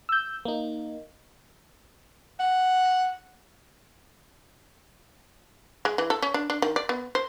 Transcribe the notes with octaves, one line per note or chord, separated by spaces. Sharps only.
E6 G6
A#3 D#4
F#5
G#3
E3
A4
C#4
D4
D4
D#3
D5
B3
C5